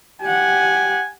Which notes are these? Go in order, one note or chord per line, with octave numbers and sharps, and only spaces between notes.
G4 F#5 G#5